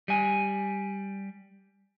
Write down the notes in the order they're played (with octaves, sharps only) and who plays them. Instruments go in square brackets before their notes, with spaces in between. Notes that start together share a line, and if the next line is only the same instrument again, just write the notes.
[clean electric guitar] G3 G#5